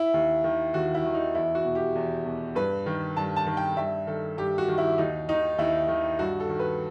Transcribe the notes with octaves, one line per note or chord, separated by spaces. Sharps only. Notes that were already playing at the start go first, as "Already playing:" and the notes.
Already playing: E4
D#2
D#3
D#2 F#4
E4
D#3
D#4
E2 E4
F#4
B2
G4
E2
B2
G2 B4
D#3
G2 A5
A5
D#3
G5
G2 E5
D#3 A4
G2 G4
F#4
D#3
E4
D#2 D#4
D#3 D#4
D#2 E4
D#3
G2 F#4
A4
D#3
B4